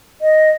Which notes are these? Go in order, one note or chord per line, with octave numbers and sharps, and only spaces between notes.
D#5